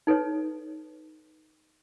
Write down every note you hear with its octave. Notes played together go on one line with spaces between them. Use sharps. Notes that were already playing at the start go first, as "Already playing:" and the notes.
D#4 A4 B4 C#5